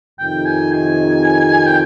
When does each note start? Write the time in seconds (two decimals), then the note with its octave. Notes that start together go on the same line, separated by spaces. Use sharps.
0.19 F2 C3 D#3 G5
0.46 G#5
0.73 G#5
1.66 G5